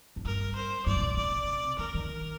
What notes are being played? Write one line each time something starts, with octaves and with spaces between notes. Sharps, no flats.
F2
G2 A#4
C5
G2 D5
C3
A#2
C3 D5
D3 A#4
D#3